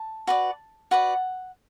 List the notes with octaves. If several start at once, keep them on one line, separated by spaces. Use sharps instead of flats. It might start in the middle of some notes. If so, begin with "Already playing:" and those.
Already playing: A5
F#4 B4 D5
F#4 B4 D5 F#5